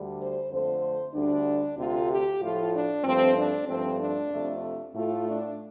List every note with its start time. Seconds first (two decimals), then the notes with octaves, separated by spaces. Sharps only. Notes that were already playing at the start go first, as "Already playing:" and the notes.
Already playing: D2 D3 G3
0.18 C5
0.50 F2 D3 A3 C5
1.14 D2 D3 G3 D4
1.77 D2 C3 A3 F4
2.09 G4
2.40 A2 F3 A3 F4
2.72 D4
3.04 G2 F3 A3 C4
3.36 D4
3.67 G2 F3 A3 C4
3.99 D4
4.31 F2 C3 A3
4.94 A2 A3 F4
5.26 D4